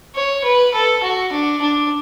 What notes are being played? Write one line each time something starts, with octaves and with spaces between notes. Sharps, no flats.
C#5
B4
A4
F#4
D4
D4